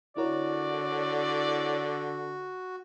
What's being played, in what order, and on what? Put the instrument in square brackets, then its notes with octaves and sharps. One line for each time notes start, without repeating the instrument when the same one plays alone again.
[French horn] D3 [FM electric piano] E4 A#4 C#5 [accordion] F#4 [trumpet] D5